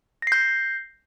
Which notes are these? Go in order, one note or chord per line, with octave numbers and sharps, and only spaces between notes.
G6 A#6 C7